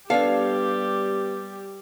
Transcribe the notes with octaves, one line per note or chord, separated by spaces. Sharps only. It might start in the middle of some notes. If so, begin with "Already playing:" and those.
G3 B3 D4 G4 A4 B4 D5 F5